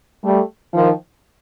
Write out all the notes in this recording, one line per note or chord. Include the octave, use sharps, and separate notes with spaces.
G3 A3
D#3 F3